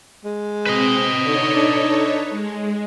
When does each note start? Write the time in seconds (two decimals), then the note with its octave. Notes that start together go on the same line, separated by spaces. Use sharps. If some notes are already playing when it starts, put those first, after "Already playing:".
0.25 G#3
0.66 C4 B4 D#5
1.23 D3 D#4 A4 C#5
1.55 D4
2.30 G#3